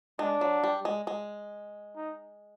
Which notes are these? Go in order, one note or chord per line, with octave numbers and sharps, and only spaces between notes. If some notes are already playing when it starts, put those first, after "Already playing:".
G#3 D4
F#3
G3
G#3
G#3
D#4